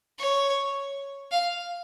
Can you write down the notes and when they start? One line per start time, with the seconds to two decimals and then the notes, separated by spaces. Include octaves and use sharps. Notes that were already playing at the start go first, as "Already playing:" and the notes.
0.19 C#5
1.32 F5